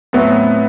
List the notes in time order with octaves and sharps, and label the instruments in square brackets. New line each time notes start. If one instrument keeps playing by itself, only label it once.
[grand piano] A2 F#3 A3 C4 [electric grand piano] B3